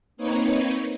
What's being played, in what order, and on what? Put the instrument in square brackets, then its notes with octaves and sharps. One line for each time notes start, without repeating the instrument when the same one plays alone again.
[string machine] A#3 C4 D#4 B4 C#5